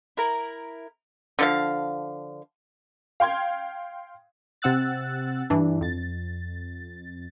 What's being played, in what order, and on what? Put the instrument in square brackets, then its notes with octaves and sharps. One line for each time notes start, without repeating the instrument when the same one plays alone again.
[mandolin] E4 A#4 A#5
[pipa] D3 F3 F5
[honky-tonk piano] F5 G5 C6 G#6
[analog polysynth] C3 C4 F#5 E6 F#6 A6
G2 E3 D4
F2 A6